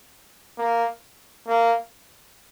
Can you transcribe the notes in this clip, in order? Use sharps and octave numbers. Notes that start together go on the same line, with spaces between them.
A#3
A#3